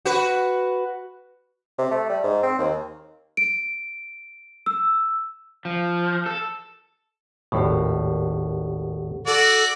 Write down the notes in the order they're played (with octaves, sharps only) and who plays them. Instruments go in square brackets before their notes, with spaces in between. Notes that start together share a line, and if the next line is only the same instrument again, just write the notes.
[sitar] F#4 B4
[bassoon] C3
A3
G3
G#2
C4
D#2
[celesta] D7
E6
[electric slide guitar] F3
A4
[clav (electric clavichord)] G#1 D#2 A2 [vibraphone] G4 A4 F#5
[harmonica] F#4 D5 [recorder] A4